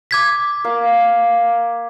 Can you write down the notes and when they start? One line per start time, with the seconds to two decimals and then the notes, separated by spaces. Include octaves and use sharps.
0.11 D6 G#6 B6
0.64 A#3 F5